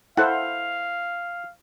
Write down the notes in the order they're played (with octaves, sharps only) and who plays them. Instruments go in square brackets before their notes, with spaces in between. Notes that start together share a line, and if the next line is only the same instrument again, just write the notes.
[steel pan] E4 A4 C5 [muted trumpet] F5 [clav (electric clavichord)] F#5